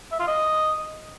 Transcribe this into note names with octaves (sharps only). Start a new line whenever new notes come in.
E5
F4
D#5